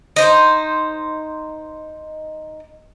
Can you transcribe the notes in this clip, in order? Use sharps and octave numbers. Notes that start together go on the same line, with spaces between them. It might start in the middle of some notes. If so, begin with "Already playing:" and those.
D#4 C5